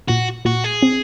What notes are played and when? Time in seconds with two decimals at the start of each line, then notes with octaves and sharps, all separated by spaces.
0.08 A#2 F#4
0.45 A#2 F#4
0.64 G#4
0.83 C4